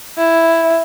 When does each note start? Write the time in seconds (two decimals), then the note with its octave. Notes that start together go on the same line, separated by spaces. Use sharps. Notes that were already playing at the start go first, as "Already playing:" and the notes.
0.17 E4